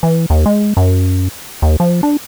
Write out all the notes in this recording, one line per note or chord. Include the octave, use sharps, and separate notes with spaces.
E3
D#2
G#3
F#2
D#2
F3
D4